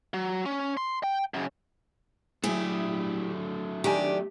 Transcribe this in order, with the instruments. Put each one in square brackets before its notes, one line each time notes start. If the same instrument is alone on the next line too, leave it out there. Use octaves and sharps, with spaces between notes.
[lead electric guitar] F#3
C#4
C6
G5
F#2 C#3
[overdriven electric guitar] F#3 A3 [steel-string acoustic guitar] E4 G4 [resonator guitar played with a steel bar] G#4
[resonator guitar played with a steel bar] D#3 D4 G#5 [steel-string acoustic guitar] G4